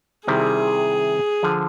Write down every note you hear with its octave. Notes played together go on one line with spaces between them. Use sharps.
C3 D#3 G3 C4 E4 G#4
D3 F3